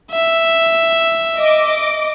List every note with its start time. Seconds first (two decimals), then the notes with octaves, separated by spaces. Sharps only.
0.12 E5
1.36 D#5 D6